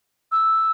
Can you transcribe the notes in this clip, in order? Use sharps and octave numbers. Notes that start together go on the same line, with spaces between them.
E6